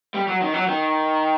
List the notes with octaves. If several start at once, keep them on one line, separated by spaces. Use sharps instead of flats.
G3
F#3
D#3
F#3
D#3